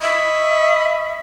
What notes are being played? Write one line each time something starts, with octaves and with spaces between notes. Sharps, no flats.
D#5 E5 B5 C#6